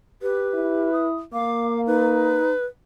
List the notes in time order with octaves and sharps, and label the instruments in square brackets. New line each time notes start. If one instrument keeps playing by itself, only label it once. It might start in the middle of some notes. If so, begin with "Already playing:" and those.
[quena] G4 [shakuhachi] B4
[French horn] E4
[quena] D#6
[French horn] A#3 [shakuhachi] F5 [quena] D6
[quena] D#4 [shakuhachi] B4